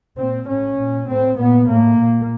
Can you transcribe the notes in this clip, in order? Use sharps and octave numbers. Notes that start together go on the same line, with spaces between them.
A#2 C4
A2 C#4
A#2
A2 C4
A#2 B3
A2 A#3
A#2